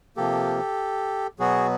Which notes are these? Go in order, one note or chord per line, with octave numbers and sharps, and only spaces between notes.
C3 F3 A#3 G4 A4
B2 F#3 B3 F#4 G#4